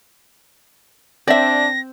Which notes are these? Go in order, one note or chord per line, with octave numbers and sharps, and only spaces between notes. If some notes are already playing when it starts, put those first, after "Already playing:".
C4 D4 D5 E5 A#6